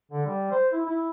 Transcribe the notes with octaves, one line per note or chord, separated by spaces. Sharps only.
D3
G3
C5
E4
E4